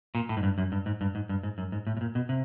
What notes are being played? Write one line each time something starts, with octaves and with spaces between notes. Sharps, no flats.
A#2
A2
G#2
G2
F#2
G2
G#2
G2
G#2
G2
G#2
F#2
G#2
A2
A2
A#2
B2
C3